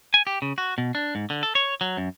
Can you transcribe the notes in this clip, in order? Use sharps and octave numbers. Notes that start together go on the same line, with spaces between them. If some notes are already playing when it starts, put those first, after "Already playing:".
G#5
G4
C#3
F#4
B2
D4
G#2
D3
A4
C#5
F#3
F#2